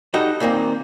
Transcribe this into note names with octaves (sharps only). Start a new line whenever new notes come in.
G3 D#4 F#4 A4 D#5
A#2 D#3 A#3 C4